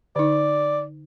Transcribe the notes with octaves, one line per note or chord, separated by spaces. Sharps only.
D3 D#4 D5